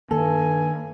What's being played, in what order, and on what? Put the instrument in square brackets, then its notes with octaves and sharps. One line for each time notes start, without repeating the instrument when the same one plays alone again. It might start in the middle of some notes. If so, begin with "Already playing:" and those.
[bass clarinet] G2 [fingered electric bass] D#3 A#3 [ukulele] A4 [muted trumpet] G#5